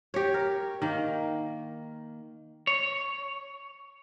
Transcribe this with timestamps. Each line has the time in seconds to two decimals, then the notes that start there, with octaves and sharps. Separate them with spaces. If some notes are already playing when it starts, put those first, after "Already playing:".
0.14 G4 C#5
0.34 A#4
0.82 D#3 A#3
2.67 C#5